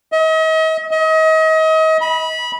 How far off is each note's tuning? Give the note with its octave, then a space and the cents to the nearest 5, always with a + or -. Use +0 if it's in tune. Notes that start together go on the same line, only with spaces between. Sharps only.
D#5 +40
D#5 +35
B5 -20